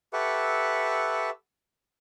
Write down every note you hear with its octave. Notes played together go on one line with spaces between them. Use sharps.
G4 A4 B4 E5 F#5 C#6